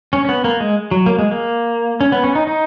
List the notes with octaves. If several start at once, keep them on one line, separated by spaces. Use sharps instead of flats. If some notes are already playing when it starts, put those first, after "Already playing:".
C#4
C#4
B3
A#3
G#3
F#3
A#3
G#3
A#3
C#4
B3
C#4
D#4
D#4